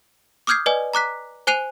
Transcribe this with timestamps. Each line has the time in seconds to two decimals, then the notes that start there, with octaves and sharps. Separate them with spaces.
0.47 D6 D#6 F6 G6 G#6 C7
0.66 B4 D5 D#5 G#5
0.93 A#5 D6 F#6 B6
1.47 C5 G#5 F#6 C7 D#7 F7